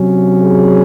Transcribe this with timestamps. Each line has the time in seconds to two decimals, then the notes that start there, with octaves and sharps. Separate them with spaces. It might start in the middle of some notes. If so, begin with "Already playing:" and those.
Already playing: C3 F#3 C#4
0.41 G#4